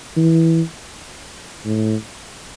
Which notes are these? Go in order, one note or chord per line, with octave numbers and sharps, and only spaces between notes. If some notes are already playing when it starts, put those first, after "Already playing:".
E3
A2